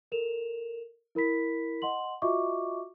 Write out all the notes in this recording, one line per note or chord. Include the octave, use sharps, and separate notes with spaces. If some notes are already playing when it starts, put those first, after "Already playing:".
A4 A#4 E7 F7
E4 A#4 B5 B6
D#5 F#5 C6 F#7
F4 F#4 D#5 E5 C#6 D6